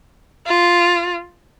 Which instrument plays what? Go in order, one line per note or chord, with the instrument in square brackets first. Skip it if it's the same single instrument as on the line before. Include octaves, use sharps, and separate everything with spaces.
[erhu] F4